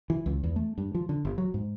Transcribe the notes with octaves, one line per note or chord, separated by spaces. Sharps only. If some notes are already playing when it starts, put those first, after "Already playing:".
E3
C#2
E2
A3
G2
F3
D3
G1
F#3
G#2